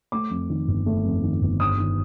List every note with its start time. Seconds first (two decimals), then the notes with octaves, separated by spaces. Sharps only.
0.12 A3 D6
0.31 F2
0.50 D#3
0.68 G1
0.86 A3
1.05 F2
1.23 D#3
1.41 G1
1.60 G2 D#6
1.78 D#3